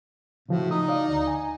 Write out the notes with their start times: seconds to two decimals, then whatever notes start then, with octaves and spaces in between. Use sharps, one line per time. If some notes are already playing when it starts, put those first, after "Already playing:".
0.49 A2 C#3 F3 F#4
0.71 D#4 D#6
0.88 D5 F5
1.08 D2
1.27 G#5